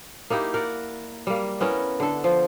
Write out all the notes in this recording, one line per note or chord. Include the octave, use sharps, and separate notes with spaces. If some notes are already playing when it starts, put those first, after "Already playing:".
A#3 D#4 E4 G4
A#4 D5 F#5
G3 A#3
B3 C#4 E4 A#4
D3 A4
F3